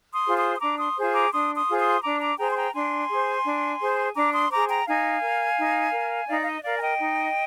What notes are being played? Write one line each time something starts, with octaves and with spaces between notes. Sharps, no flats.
C6 D#6
F4 G#4 C5
C6 D#6
D#6
D4 A#5 D6
C6 D#6
F4 G#4 C5
A#5 D6
D4 C6 D#6
C6 D#6
F4 G#4 C5
C6 D#6
D4 A#5 D6
A#5 D6
G#4 C5 G5 A#5
C6
G5 A#5
D4 G#5 C6
G#4 C5
D4
G#4 C5
D4 A#5 D6
C6 D#6
G#4 C5 A#5 D6
G5 A#5
D#4 F5 G#5
A#4
D#4
A#4
D#4 D5 F5
F5
D#5
A#4 D5 F5
G#5
D#5 G5
D#4